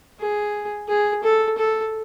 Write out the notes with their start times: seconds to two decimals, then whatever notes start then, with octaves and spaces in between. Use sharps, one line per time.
0.19 G#4
0.88 G#4
1.24 A4
1.58 A4